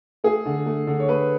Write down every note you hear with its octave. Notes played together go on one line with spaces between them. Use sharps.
A3 G#4
D3
A3
D3
C#5
A3 B4